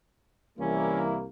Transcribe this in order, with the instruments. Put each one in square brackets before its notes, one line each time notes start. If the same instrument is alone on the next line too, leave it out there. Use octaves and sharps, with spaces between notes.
[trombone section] C2 A#3 [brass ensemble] E3 G3 E4 [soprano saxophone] C#4